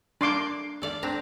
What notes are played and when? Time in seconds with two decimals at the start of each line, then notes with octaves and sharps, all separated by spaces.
0.21 A#3 D4 D5 C6 D6
0.82 A4 D5 F5
1.03 C4 D4 A#5